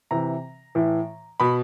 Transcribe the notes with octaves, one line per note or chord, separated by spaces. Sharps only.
C3 E3 A#5
A2 E3
B2 B5